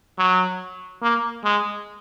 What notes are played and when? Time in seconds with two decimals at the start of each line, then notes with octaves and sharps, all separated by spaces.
0.18 F#3
1.02 A#3
1.44 G#3